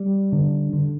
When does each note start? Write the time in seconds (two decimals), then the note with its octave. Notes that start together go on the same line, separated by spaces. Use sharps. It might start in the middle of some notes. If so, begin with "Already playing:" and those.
Already playing: G3
0.32 D3
0.73 D3